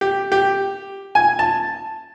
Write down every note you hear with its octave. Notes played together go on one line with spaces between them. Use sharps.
G4
G4
G#5
A5